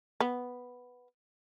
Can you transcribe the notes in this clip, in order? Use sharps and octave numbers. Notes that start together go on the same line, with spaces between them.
B3